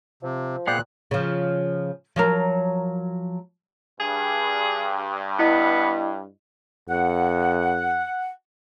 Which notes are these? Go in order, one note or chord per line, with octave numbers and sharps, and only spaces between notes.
C3 F3
A#2 B3 G#4 D5 F5 G5 F#6
C#3 F3
F3 F#3 A#4
G2 G#4
B3 E4 D#5
F2 F#5